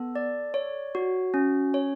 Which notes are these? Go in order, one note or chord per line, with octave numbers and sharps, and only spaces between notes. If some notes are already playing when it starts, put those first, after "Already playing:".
Already playing: B3 A4
D5
C#5
F#4
C#4
C#5